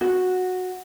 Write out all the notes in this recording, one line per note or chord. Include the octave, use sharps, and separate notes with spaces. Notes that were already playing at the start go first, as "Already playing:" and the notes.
F#4